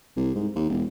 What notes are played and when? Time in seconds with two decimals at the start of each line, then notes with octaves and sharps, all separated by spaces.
0.17 C2
0.35 G#2
0.55 D#2
0.69 E1